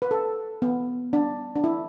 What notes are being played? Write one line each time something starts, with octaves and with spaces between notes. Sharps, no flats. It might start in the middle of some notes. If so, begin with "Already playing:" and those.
B4
A4
B3
D4
D4
E4